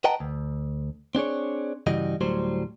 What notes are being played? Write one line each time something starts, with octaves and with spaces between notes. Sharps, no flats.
B4 D#5 F#5 G5 A5 A#5
D2
C4 D4 G#4 C#5
G2 C#3 E3 G3 F#4 D#5
D2 A2 F#3 G3 C5